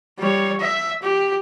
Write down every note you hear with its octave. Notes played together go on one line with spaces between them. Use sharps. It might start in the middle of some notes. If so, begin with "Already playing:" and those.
G3 C#5
E5
G4